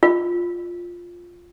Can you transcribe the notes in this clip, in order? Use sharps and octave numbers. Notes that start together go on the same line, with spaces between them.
F4